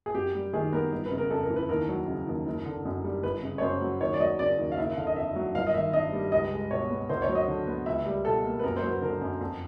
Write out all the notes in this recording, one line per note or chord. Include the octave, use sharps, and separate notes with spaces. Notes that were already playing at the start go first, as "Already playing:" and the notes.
G#4
F#2 G4
G3
D#3 G#4
B3 A#4
G1
B4
C#3
A#4
F2 A4
A#4
E3
B4
D#2 A#4
F#3
C#3
D#2
F#1
D3
F#2
G3
G1 B4
C#3
C#5
F#2 C5
F#3
D#2 C#5
D5
F#3 D#5
C#3 D5
D#2
F5
F#1 E5
D3 F5
D#5
F2 E5
F#3
G1 F5
D#5
D#3 E5
G2 D#5
G3
C#2 D#5
G#3
B2 C#5
B3
D2 C5
C#5
F#3
D#5
D3
B3
C#2 E5
G3
B2 A4
A#3
B4
F#2 A#4
C5
F#3
B4
D3 A#4
F#2
F2